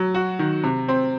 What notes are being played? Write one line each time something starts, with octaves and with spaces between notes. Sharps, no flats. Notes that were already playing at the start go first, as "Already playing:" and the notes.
Already playing: F#3
F#4
D#3
C3
C4